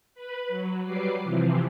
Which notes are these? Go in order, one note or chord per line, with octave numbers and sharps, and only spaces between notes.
B4 B5
F#3
F#3 G3 B4 D6 C7
C3 E3 F3